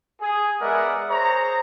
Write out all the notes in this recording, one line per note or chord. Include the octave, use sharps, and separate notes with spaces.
G#4
G#3 B3 A#4 D5 E5 F#5
G#4 C5 C#5 A#5